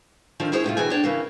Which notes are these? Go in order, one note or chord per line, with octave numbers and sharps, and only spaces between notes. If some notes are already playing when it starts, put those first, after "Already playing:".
D3 D#3 F3
C#4 E4 G#4 C5 C#5
A2 C3 A3 F4
B2 D3 E3 G#4 G5 G#5
D4 C#5 D5 G5
C#3 E3 A#3